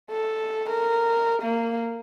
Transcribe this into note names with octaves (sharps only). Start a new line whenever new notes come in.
A4
A#4
A#3